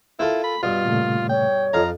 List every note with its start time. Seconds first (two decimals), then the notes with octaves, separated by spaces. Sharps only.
0.19 A#3 E4 F4 A4
0.44 B5
0.63 G2 B2 F4
0.85 A#2 C#3 A3
1.29 C#5 G5
1.73 F2 F4 A4 D#5 F5 A#5